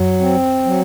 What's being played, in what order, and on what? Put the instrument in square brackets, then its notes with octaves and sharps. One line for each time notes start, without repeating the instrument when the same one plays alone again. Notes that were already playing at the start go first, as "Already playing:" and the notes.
Already playing: [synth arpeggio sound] F#2 [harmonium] F#3
[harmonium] C4
F#3